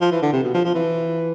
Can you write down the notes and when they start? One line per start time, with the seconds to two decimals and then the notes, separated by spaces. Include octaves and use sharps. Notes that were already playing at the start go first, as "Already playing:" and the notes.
0.01 F3
0.11 E3
0.22 D3
0.32 C3
0.43 B2
0.54 F3
0.64 F3
0.75 E3